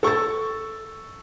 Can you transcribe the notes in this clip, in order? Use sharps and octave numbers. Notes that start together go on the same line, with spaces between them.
A4 C#6 E6 A6